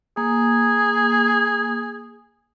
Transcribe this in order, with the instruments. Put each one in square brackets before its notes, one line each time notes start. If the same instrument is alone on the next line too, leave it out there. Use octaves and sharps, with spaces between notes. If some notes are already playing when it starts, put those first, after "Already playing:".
[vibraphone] A#3 [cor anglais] G#4